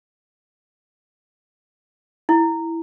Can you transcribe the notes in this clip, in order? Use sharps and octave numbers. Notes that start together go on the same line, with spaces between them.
E4